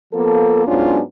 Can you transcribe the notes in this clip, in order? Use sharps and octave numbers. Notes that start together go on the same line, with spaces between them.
F3 A#3 B3 A4
G#2 F#3 B3 C#4 D4 F4